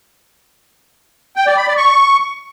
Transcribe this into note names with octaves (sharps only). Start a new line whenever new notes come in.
G5
D5
B5
D5
C#6